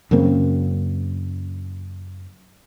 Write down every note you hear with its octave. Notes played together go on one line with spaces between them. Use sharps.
F#2 C#3 A#3 C4